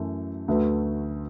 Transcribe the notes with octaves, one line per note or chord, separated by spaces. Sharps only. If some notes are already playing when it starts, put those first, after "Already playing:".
Already playing: F#2 E3 A3
D2 D3 A3 F#4 B4